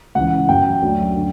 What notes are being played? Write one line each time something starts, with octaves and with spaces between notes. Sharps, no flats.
C#2 C#3 E3 F#5
F#2 C#3 F#3 G5
D2 D3 F#3
D3